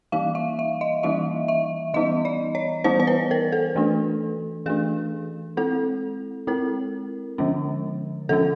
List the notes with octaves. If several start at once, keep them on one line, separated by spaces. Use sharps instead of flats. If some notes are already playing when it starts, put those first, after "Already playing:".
E3 G3 A#3 D#4 F5
E5
E5
D#5
E3 G3 A#3 D#4 E5
E5
E3 G3 B3 D#4 D#5
D5
C#5
E3 G3 B3 D#4 C5
C5
B4
A#4
A4
E3 A3 D4
E3 A3 D4 G#4
G#3 C4 E4 A4
G#3 C4 E4 A#4
D3 F3 G#3 C#4
D3 F3 G#3 C#4 A4